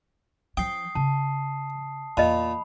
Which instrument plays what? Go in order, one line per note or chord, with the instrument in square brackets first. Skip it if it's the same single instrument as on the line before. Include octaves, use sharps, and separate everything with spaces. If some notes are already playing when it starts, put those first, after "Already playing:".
[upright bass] F3 C#4 [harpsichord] G5 [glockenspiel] D#6 C7
[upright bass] C#3 [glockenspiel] A5
[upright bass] E2 [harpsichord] A#2 [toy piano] D#5 A5 [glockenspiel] B5